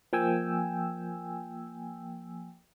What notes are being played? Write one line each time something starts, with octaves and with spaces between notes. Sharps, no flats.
F3 A#3 G5 G#5 E6